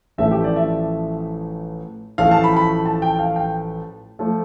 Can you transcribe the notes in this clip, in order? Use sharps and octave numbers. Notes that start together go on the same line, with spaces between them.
A1 A2 F3 A3 E5
G4
D5
E5
A1 A2 F3 A3 F5
A5
B5
B5
A5
G5
F5
G5
F3 A3